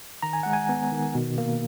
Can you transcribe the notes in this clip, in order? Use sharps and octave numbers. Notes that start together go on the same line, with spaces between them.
D#3 A#5
G#5
G#3 F#5
G#5
B3
D#3
B2
A#3